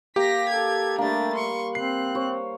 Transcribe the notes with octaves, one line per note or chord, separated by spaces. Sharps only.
A#3 G4 A#6 B6
A4 G#6
G3 A3 A#3 D4 A6
C6 C#6
C4 F#6 C7
C5 C#5